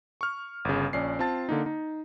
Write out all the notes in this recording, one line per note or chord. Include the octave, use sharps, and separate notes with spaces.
C#6 F6
G1 C#3
A#1 C#4 D5 C7
C4 F4 A5 A6
D3 A#3 D#4
D#4